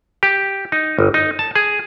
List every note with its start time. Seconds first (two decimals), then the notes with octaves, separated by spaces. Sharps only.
0.23 G4
0.72 D#4
0.99 G1
1.14 D#4
1.39 A5
1.56 G#4